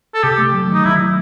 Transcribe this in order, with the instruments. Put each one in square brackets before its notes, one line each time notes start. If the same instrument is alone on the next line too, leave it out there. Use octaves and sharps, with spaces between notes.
[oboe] A4
[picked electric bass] C3 [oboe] G4
[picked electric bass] A3
F#3
[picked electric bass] D#3 [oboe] D#4
[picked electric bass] F#3 [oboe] E4
[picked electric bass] A3